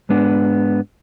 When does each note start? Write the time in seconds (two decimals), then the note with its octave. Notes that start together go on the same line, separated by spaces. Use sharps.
0.09 G#2 G#3 B3 D4